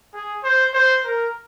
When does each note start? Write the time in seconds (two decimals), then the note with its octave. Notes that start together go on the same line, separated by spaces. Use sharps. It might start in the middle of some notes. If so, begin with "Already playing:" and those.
0.14 G#4
0.44 C5
0.74 C5
1.04 A#4